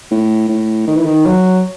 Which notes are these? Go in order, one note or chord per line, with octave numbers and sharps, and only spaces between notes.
A2
A2
D#3
E3
D#3
F#3